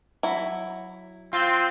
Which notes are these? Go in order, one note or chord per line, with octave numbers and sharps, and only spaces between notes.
F#3 E4
C4 F4 C6